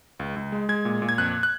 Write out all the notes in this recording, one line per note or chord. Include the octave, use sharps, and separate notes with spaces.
C#2
C#2
G#3
G#3 G#6
A#2
A#2
G#6
F2 F#6
F#6